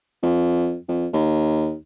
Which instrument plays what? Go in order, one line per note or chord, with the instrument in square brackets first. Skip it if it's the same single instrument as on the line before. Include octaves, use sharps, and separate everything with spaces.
[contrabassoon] F2
F2
D#2